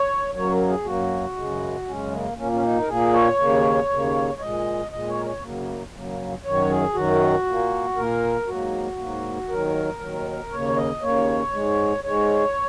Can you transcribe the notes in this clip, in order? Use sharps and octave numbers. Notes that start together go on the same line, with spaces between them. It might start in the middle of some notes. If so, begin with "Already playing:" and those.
Already playing: C#5
F#2 F#3 A#3 C#5
G#4
F#2 F#3 A#3 F#4
F#2 C#3 G#3
F#2 C#3 G#3 C#4
A#3
A#2 A#3 C#4
C#4
D#4
A#4
A#2 A#3 G#4
C#5
D#2 C#3 A#3
D#2 C#3 A#3
C#5
A#2 G#3 D#5
A#2 G#3 D#5
C#5
A#4
C#5
F#2 C#3 F#3 A#3
F#2 C#3 F#3 A#3
F#2 D#3 F#3 C#5
G#4
F#2 D#3 F#3 F#4
A#2 A#3
A#2 A#3 A#4
G#2 F#3 A#3 F#4
G#2 F#3 A#3
D#2 D#3 F#3 A#4
D#2 D#3 F#3
D#2 C#3 A#3 C#5
D#5
D#2 C#3 A#3 C#5
G#2 G#3
G#2 G#3 C#5